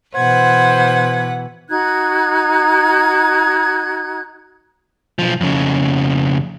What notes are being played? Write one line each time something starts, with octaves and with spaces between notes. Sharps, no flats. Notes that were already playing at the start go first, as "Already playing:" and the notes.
B2 E3 B4 C5 F#5 G#6
D#4 F#4 F#6 G#6
B1 F3
F2 C#3